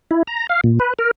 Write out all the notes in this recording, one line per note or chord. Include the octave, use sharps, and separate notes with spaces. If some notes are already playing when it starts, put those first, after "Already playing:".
E4
A#5
F5
A#2
B4
A#4